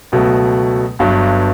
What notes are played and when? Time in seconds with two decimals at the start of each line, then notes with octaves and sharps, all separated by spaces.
0.12 C#2 B2 F#3 A3
0.99 G1 G2 F#3